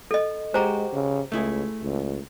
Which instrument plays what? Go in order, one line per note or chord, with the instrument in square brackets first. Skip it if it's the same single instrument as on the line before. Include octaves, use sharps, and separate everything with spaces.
[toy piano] A4 D#5
[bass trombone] G#3 [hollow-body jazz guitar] F#4 G4 [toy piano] C5 A#5
[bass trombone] C#3
[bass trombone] C#2 [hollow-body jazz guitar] A3 E4 G#4
[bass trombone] C#2